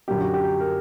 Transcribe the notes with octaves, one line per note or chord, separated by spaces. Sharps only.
F#2 D3 F#3 A#3 G4
F#4
G4
A#4